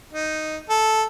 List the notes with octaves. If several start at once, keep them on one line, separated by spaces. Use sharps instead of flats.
D#4
A4